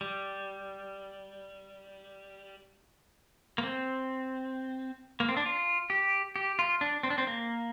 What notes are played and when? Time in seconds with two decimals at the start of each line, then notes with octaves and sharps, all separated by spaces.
0.01 G3
3.58 A#3
3.63 C4
5.20 A#3
5.29 C4
5.37 D4
5.46 F4
5.90 G4
6.36 G4
6.59 F4
6.81 D4
7.03 C4
7.10 D4
7.18 C4
7.27 A#3